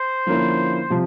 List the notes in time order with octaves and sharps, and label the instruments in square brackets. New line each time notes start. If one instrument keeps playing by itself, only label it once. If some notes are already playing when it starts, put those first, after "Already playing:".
Already playing: [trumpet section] C5
[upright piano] D3 F3 A#3 C#4 E4
C3 F3